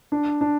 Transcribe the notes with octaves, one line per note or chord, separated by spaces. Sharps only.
D4
D4